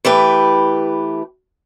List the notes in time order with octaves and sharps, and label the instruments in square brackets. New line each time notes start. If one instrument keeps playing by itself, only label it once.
[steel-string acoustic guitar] E3 A3 G4 B4